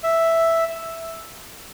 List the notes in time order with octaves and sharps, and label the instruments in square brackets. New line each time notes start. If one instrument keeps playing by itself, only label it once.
[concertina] E5